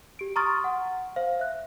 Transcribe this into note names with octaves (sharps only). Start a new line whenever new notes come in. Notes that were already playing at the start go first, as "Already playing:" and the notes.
G4 D7
A#5 C6 C#6 D#6 F6 A6
F#5
C5 F5
E5 F#6